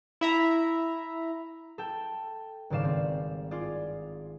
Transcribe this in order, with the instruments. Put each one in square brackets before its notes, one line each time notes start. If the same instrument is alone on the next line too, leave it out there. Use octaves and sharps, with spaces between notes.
[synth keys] E4 E5 A#5
[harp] A4 G5
G#1 G2 C#3 D5 F5 E7
C4
F4 G#4 D5